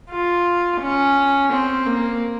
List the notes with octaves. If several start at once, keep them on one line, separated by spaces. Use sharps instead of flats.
F4
C#4
C4
A#3